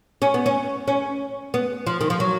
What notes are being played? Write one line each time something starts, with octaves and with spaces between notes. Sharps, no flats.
C#4
B3
C#4
C#4
B3
F3
D#3
F3
F#3